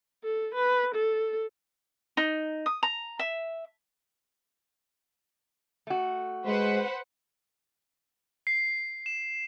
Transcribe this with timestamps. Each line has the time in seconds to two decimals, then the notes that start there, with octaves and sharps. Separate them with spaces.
0.24 A4
0.55 B4
0.95 A4
2.17 D#4
2.66 D#6
2.83 A#5
3.19 E5
5.87 A3 F#4
6.46 G#3 B4 C5 F#5
8.47 C7
9.06 E7